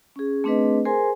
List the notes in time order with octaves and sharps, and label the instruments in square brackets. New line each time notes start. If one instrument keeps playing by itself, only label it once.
[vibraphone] C#4 G#4
A3 C4 D4 G#4 B4 D#5
G#4 A#4 C5 G#5 C6